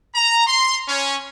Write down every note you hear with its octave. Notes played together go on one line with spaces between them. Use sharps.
A#5
C6
C#4